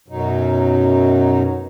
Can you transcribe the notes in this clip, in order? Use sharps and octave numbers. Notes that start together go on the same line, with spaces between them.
F#2 B2 F#3 D#4